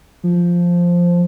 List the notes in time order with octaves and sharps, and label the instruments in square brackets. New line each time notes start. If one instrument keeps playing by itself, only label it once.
[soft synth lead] F3